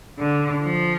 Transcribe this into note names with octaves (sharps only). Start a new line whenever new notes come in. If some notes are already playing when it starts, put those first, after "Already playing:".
D3
F3